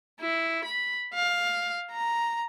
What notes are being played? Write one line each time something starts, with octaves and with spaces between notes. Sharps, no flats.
E4
B5
F5
A#5